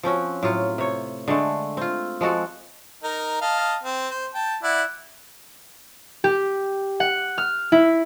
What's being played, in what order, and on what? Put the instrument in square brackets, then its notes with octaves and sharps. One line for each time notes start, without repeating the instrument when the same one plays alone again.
[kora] F3 C4 C#4 F#4
A2 F#3 F4
C3 C#5
D3 G#3 A3
C4 F4
F3 G#3 F#4 A4
[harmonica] D#4 A#4
D#5 F5 A5
C4
C5
G5 A5
E4 D5 F#5
[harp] G4
F#5
F6
E4